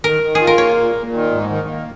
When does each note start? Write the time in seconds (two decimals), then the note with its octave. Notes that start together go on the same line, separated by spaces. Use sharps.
0.04 D#3 A#4
0.23 D#3
0.35 G#4
0.41 F4
0.47 A#4
0.58 A#3 C#5
0.77 A#2
0.95 A#2
1.13 D#3
1.31 G#2
1.49 D#3
1.68 A#3